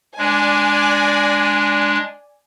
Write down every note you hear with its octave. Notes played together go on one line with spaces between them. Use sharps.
G#3 D4 D5 G#5